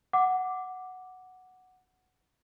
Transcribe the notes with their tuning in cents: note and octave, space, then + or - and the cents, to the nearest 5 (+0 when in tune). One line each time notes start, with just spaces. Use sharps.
F#5 +0 D6 +0